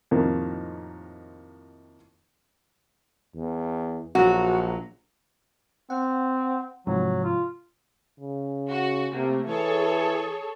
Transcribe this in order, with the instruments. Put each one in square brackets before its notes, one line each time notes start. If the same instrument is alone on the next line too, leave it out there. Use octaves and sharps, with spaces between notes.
[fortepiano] F2 A2 C3 D#3 A#3
[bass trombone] E2
[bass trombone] A#1 [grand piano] F#3 [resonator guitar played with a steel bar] F#4
[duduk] C4 [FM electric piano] F#5
[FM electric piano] G#2 C3 F3 [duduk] F#3
[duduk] F4
[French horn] C#3
[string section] F#4
[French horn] C3 [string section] A3 A#3
[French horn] E3 [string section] G#4 A4 C#5